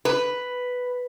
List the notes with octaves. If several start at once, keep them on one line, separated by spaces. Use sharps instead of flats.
B4